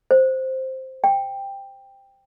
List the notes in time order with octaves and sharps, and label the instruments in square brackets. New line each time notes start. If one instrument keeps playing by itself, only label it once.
[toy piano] C5
G5